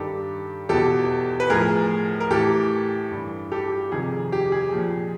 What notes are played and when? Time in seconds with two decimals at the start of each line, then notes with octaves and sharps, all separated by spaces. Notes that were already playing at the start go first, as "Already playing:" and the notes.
Already playing: G2 D#3 G4 A4
0.69 E2 B2 G4 A4
1.40 B4
1.50 A2 F3 G#4 A#4
2.20 A#4
2.31 A2 E3 G4 A4
3.11 G2 E3
3.52 G4 A4
3.72 G4
3.92 F2 C3 D#3 G#4
4.32 G4
4.52 G#4
4.72 A#2 F3